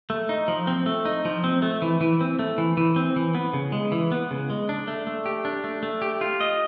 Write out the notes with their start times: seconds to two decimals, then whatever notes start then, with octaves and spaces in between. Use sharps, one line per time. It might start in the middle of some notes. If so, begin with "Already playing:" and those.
0.10 A3
0.29 D#4
0.48 F3
0.67 C4
0.86 A3
1.05 D#4
1.25 F3
1.44 C4
1.62 A3
1.82 E3
2.01 E3
2.21 C4
2.39 A3
2.58 E3
2.77 E3
2.96 C4
3.16 E3
3.35 B3
3.53 C#3
3.72 G#3
3.92 E3
4.12 B3
4.31 C#3
4.50 G#3
4.69 D4
4.88 A3
5.07 A3
5.26 G4
5.45 D4
5.64 A3
5.83 A3
6.02 G4
6.21 F4
6.41 D#5